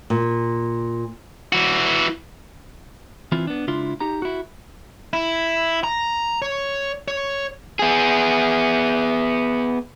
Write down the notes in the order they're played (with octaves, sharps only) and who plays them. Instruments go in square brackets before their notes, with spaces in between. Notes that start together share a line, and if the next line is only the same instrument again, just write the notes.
[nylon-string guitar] A#2
[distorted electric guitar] E3 F#4
[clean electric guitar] E3 C4 E4 F4
B3 D4
C#2 D4 E4 F4 C6
D#4 G4 A#5
E4 F#4
[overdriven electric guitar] E4
A#5
C#5
C#5
B3 G#4